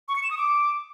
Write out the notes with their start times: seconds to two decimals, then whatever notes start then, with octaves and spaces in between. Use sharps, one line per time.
0.08 C#6
0.16 C#7
0.23 E7
0.31 D#6
0.38 D6